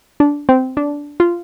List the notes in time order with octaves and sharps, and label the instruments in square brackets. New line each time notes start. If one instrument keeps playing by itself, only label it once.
[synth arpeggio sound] D4
C4
D4
F4